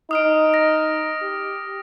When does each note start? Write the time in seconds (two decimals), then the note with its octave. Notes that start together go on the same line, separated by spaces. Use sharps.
0.11 D#4 D#6 F6 D7
0.54 A#6
1.22 G4